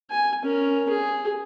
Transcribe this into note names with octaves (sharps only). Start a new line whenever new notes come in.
G#5
C#4 A#4
G#4